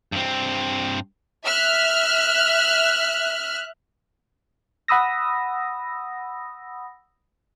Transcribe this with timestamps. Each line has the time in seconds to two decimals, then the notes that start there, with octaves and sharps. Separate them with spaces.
0.12 G2 C4
1.45 E5 F6 F#6
4.88 F#5 B5 D#6 E6 A#6